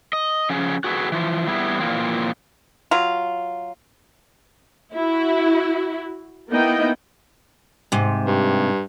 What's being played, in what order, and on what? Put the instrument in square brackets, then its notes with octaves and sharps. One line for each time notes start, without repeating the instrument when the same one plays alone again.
[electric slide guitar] D#5
F3 C#4 G#4
F#4 G#4 A4 B4
E3 F3
G3 B3 E4 G#4
A#2 E3 F3 A#3 C4
[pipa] F#3 F4
[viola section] E4 F#4
A#3 B3 D#4 E4 D#5 G5
[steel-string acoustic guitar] G#2 C3
[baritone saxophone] G2